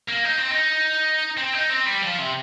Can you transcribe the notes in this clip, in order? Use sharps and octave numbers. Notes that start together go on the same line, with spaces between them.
A#3
D#4
C4
D#4
C4
D#4
C4
G3
F3
C3